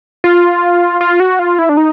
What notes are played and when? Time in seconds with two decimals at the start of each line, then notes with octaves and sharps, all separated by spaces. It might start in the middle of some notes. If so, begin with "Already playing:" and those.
0.24 F4
1.01 F4
1.20 F#4
1.39 F4
1.59 E4
1.69 D4
1.77 D#4